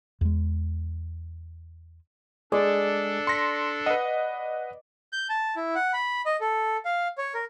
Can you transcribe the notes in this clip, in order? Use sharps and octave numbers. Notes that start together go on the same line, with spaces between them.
E2 G#3
G#3 D4 G#4 A4 D5
C6 A#6 B6 C#7
B4 D#5 F#5
G6
A5
E4
F#5
B5
D#5
A4
F5
C#5
A#4